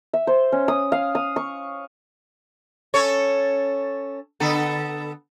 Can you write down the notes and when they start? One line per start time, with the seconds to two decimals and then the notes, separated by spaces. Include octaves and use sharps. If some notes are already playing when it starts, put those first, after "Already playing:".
0.13 E5
0.27 C5
0.52 C#4
0.68 D#6
0.92 F5
1.15 D#6
1.36 C#6
2.94 C#4 A4 C#5
4.40 D3 B3 A4